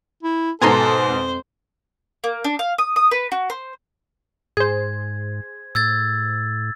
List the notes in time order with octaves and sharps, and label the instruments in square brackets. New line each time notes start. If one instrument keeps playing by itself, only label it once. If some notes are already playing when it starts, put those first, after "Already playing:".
[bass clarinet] E4
[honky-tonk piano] G#2 B2 [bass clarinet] A4 [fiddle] C5 [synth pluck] G#5 A#5 C6
[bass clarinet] F2
[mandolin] A#3
D4
F5
D#6
D#6
B4
F#4
C5
[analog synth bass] G#2 [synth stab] G#4 C5 [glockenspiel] G#6
[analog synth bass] A2 [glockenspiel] E6 G#6 A6